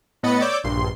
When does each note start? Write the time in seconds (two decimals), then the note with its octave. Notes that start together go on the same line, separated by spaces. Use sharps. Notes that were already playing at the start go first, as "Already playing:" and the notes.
0.23 A2 B3 D#5 B5 A6 C#7
0.42 C#5 D5 D6 E6 G6
0.64 A#1 G2 C6